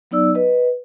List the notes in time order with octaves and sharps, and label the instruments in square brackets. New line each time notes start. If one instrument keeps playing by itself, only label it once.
[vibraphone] F#3 B3 D#4 D5 E6
B4 D#5